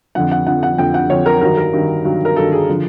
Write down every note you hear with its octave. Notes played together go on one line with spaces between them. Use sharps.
F2 D3 F3 F#5
F#5
F2 D3 F3 F#5
F#5
F2 D3 F3 G5
F#5
F2 D3 F3 C#5
A#4
G2 D#3 F#3 A#4
A#4
G2 D#3 F#3
G2 D#3 F#3
A#4
G2 D#3 F#3 A4
G#4
D3 F3